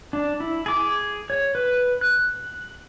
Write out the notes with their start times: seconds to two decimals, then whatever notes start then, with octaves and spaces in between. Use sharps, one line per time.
0.13 D4
0.40 E4
0.66 G#4 D6
1.30 C#5
1.55 B4
2.01 F#6